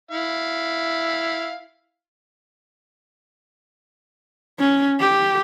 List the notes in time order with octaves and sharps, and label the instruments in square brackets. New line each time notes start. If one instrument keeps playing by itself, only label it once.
[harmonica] E4 F5
[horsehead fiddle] C#4
G4